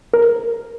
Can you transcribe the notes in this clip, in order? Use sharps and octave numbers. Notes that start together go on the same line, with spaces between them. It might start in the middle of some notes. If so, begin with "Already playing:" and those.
A#4